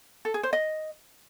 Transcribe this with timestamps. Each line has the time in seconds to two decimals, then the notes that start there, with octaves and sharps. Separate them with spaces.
0.25 A4
0.34 G#4
0.43 C5
0.53 D#5